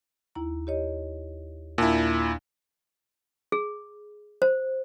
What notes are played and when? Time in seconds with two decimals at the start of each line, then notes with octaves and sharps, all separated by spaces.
0.35 D#2 E4 A#5
0.67 G4 C#5 D#5
1.78 D#2 A#2 D4 E4 A5
3.52 G#4
4.42 C5